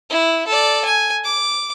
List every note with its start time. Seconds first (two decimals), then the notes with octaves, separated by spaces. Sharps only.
0.10 E4
0.47 A4 D5
0.85 G#5
1.24 D6